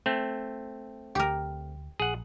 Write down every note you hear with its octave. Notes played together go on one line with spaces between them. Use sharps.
A3 C4
D2 G4 A#4
A#1 G#4 F#5